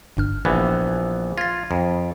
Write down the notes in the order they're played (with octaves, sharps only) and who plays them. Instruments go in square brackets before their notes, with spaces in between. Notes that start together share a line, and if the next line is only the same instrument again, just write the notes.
[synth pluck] G1 G2 F6
[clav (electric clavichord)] A#1 E3 B3
[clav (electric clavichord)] F4 [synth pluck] G#6 A6
[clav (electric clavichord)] F2